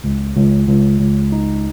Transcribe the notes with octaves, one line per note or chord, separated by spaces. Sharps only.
C#2
C#2
C#2
C#2
D#4